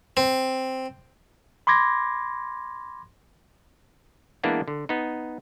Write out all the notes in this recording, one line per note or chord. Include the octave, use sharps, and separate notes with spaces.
C4
B5 C6 D6 G#6 A#6
E3 G#3 A#3 B3 D4 E4
D3
B3 D#4